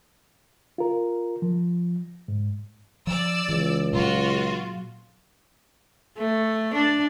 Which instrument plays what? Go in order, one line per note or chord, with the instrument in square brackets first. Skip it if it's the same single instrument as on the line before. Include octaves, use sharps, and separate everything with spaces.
[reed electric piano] F4 A#4
F3
G#2
[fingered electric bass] F3 [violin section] D5 E6
[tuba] C#2 [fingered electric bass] E3
[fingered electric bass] A#2 F#3 [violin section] F4 F#4
[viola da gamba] A3
D4